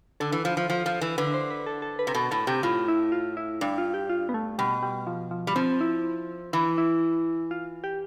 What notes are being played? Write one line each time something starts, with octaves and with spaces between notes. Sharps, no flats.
D3 A4
E3
F3
F3
F3
F3
E3
D3 B4
C5
B4
A4
A4
B4
C3
B2 A4
A2 A4
C3 G4
A2 F4
E4
F4
E4
G2 D4
F4
G4
F4
B3
A3
B2 G3
G3
F3
F3
G3
F3 C4
E4
E3 E4
E4
F4
G4